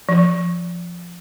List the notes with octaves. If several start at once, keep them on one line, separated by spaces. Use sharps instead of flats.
F3